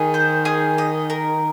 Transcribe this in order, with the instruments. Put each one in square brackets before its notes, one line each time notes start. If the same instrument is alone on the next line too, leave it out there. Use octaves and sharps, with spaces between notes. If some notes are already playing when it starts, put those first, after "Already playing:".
Already playing: [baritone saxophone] D#3 [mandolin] G#4
[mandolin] C5
G#4
D#5
A#4